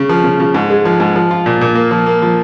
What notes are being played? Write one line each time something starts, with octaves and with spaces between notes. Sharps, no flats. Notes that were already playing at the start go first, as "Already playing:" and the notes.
Already playing: C#3
F3
C#3
C#3
G#2
G#3
F3
G#2
F3
F4
A#2
A#2
A#3
F3
A#3
F3